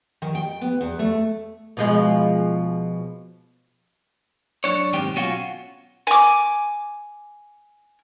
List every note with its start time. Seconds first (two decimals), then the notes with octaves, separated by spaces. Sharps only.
0.22 D#3
0.35 G5
0.61 B3
0.81 E2
0.99 A3
1.77 B2 F3 G#3
4.64 F#2 D4 C#5
4.93 B1 G#2 D#3 C4 G4
5.16 B2 F#3 C#4 F4 F#4
6.07 G#5 D6